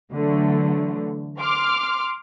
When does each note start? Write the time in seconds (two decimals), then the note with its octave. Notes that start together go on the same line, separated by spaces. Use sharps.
0.13 D3 E3 F#3 A3
1.39 C6 D6 F6